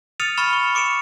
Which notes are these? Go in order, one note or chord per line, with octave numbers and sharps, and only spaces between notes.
D#6 F6 A6 C#7 D#7 F7
B5 C#6 F6 A6 C#7 E7
C#6
D6 C#7 D7 E7